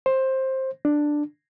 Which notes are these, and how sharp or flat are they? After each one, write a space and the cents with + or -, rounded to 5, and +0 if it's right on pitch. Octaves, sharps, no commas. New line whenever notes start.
C5 +15
D4 +5